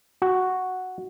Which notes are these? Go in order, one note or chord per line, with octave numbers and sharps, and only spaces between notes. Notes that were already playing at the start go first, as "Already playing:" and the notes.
F#4